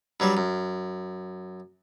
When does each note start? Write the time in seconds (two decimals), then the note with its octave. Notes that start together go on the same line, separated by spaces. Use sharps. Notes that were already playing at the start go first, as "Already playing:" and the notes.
0.20 G2 F#3 G3
0.37 F#2